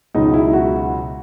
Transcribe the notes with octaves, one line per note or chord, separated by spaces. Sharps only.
C#2 B2 F#3 D#4
E4
F#4